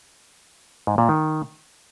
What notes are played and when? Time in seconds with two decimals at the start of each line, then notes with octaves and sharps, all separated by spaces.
0.87 G#2
0.98 A#2
1.09 D#3